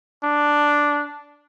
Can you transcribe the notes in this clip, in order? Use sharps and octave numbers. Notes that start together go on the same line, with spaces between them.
D4